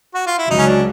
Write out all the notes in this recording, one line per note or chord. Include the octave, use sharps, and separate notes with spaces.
F#4
F4
E4
C#2 C#3 F#3 D#4
C#4
D4